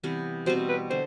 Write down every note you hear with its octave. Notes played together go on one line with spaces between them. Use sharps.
C3 E3 G3 B3
B2 G3 C4 C5
B4
D3 C5